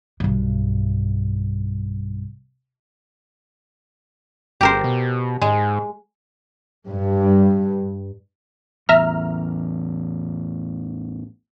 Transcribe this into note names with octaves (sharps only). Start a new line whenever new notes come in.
B1 G2
G1 G4 A#4 C5
B2
G#2 G#3
G2
A1 E2 E5 A#5 F6